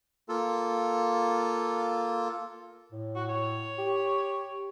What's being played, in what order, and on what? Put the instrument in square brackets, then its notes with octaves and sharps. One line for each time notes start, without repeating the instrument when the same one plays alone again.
[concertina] A#3 F4 A4
[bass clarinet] A2
[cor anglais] F#4
C#5
[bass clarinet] G4